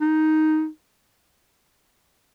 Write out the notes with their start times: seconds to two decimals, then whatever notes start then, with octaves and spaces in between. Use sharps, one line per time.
0.01 D#4